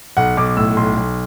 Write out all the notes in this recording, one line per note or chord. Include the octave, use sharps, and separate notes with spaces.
B1 F#5
B1 D6
A2 E6
B1 C6
B1